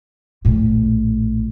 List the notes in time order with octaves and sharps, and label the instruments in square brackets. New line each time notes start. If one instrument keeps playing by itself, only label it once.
[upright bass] A#1 A2